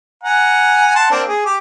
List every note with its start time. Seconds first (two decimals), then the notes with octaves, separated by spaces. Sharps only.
0.23 F#5 G#5 A#5
0.95 F#5 A5 C6
1.11 A#3 C4 D4
1.27 G#4
1.45 G4 D6